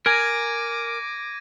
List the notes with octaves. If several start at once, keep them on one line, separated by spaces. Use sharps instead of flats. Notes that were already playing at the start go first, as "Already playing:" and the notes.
A#4 G#5 D6 G#6 A#6 D#7